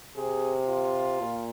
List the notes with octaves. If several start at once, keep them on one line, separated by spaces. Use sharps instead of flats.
C3 G#4
F4
A#2